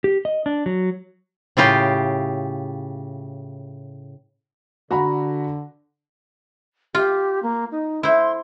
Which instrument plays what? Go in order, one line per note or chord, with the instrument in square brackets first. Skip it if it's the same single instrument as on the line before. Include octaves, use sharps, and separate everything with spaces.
[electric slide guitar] G4
D#5
D4
F#3
[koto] A2 C#3 F4 G4
[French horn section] D3 [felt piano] F#4 A#5 B5
[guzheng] F4 [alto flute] G4
[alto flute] A#3
D#4
[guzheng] E4 C5 [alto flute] C6